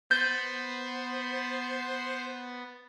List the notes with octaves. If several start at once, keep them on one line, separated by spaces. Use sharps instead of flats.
B3 C5 G6 A6